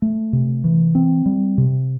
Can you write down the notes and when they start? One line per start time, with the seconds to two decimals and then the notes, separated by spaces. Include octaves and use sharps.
0.02 A3
0.33 C3
0.64 E3
0.95 C4
1.26 G3
1.58 C3